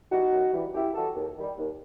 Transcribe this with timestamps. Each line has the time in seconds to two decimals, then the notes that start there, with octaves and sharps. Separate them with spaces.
0.11 E3 G3 D#4 F#4
0.32 F#2
0.52 E3 G3
0.74 F#2 E4 G4
0.94 E3 G3 F#4 A4
1.16 D#2
1.37 D#3 G3
1.58 D#2